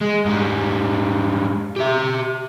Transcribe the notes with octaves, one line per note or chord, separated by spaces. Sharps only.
G#3
G#2 G3
G4 E5